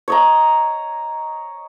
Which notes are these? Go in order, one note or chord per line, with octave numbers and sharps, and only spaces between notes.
C#5 D#5 A#5